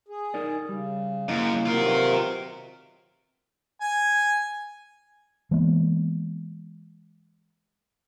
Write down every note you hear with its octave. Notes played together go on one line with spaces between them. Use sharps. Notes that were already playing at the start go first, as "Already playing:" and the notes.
G#4
D#4 A#4 D5
C#3 G3
F#2 A#3 E4 D#5
C3 D#3 F#3 F4 A#4
B4 E5
G#5
E3 G#3 A#3 B3